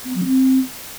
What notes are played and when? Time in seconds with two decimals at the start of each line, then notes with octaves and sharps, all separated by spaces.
0.05 B3
0.15 F#3
0.25 C4